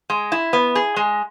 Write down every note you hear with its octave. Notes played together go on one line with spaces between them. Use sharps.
G#3
E4
B3
G#4
G#3